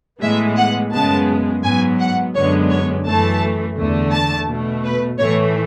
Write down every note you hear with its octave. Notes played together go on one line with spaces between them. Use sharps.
A2 E3 G#3 B3 E5
F#5
F#2 C#3 G#3 B3 A5
G#2 F#3 B3 G#5
F#5
F#2 D3 G#3 B3 C#5
C#5
F#2 E3 A3 A5
E2 D3 A3
A5
B2 A3
B4
A2 E3 A3 C#5